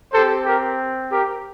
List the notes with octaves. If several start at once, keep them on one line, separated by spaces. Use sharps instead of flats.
C4 G4 A4 C5
G4 A#4
G4 A#4